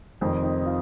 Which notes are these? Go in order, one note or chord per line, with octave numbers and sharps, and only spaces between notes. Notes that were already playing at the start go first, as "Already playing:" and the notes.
F1 F2 D#3 C4
D#4
F4